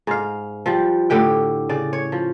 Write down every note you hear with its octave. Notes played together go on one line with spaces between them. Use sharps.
G#2 F5
F3 G3
A2 D3 G4 G5
C#3 D5
C#5
F3